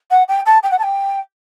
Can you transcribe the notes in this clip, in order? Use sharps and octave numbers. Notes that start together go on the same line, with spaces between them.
F#5
G5
A5
G5
F#5
A5
G5